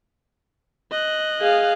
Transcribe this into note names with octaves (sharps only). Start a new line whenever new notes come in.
D#5 F#6
G#4 F5